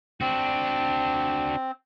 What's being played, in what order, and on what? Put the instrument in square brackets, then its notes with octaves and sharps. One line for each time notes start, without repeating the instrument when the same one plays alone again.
[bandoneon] C4 [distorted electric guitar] D4 F#4